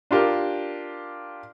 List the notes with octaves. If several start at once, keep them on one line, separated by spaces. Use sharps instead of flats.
D4 F4 G4 A#4